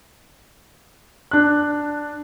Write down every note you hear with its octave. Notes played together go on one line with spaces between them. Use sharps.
D4 F#6